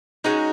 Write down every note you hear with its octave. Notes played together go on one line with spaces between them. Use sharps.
G#3 C#4 D#4 F#4